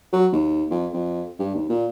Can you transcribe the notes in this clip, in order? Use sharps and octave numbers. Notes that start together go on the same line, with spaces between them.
F#3
D#2
F2
F2
G2
D#2
A#2